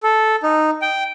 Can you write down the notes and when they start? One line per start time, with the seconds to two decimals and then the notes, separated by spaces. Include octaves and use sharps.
0.03 A4
0.43 D#4
0.82 G5